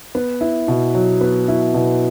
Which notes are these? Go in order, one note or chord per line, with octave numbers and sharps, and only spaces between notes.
B3
E4
B2
F#3
B3
E4
B2